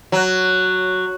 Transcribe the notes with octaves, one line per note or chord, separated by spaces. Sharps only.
F#3